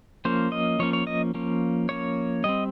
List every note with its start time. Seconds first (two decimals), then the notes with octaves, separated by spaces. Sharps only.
0.25 F3 A#3 C#4 C5
0.52 D#5
0.79 F3 A#3 C#4 C#5
0.93 C#5
1.07 D#5
1.34 F3 A#3 C#4
1.89 F3 A#3 C#4 C#5
2.44 G3 C4 D#5